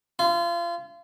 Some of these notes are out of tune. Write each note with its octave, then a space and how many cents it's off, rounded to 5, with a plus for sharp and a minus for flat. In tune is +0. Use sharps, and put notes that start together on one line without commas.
F4 -30